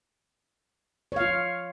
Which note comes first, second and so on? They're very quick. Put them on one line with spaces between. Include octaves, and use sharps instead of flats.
C#5 F5 F4